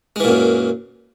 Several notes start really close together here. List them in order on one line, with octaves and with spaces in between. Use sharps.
G#3 E3 A#2 F#2